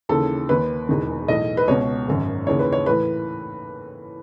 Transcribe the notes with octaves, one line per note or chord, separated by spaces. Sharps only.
D#2 C#3 E3 A4
D#2 D#3 B4
E1 E2 D#3
B1 A2 E3 D#5
B4
C#2 B2 C#5
G#1 F#2 D#3
D#2 C#3 E3 C#5
B4
C#5
A2 E3 B4